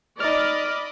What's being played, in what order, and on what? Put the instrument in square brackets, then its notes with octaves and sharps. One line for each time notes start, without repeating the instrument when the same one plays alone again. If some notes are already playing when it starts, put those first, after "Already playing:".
[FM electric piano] D#4 F6 [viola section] D5 [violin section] D#5 B5 D6